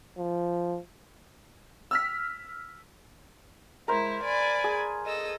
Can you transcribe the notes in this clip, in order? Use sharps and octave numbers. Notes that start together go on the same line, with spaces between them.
F3
E6 F6 B6
G#3 E4 A#4 C5
D5 G#5 B5
G#4
A4 D#5 E6